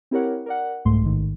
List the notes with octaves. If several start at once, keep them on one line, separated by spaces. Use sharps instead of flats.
C4 E4 G4 A#4 C#5 F#5
A#4 D5 F#5
C2 G#2 A3 C6
A1 G#2 D#3